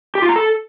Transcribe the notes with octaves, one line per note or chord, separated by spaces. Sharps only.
G4
F4
A#5
A4